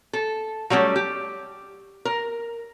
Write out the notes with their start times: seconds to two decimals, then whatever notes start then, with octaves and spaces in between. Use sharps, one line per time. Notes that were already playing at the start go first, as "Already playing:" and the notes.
0.13 A4
0.70 F#3 G3 A3 C4 C#4
0.96 G4
2.05 A#4